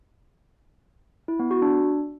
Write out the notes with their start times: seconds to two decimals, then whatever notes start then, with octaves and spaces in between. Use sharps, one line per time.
1.28 E4
1.40 B3
1.51 F#4
1.62 D4